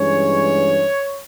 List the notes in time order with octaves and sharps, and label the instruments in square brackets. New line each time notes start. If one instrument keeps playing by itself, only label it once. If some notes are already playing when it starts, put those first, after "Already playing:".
Already playing: [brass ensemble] G2 E3 G#3 C#4 C#5